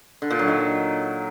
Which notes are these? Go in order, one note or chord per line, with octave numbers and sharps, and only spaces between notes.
D3
A#2
F#3
D#3